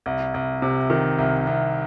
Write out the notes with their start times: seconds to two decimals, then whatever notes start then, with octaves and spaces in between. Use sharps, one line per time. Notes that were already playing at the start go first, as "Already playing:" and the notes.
0.06 C2
0.34 C2
0.62 C3
0.90 D#3
1.18 C2
1.47 C2